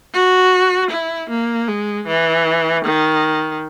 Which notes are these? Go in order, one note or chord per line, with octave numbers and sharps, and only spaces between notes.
F#4
E4
A#3
G#3
E3
D#3